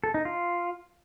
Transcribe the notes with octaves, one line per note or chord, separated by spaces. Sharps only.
A4
D#4
F4